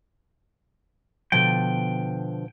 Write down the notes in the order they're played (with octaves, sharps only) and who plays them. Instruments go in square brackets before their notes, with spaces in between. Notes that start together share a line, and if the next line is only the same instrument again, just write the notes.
[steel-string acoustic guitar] B2 D3 F3 [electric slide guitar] G5